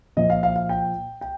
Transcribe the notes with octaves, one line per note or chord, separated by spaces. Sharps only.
A#2 F3 D#5
F5
F5
F5
G5
G5